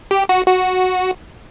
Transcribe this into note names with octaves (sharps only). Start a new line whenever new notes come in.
G4
F#4
F#4